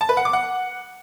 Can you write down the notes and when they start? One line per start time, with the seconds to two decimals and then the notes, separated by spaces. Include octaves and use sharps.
0.01 A5
0.09 B4
0.17 F#5
0.25 D6
0.33 F#5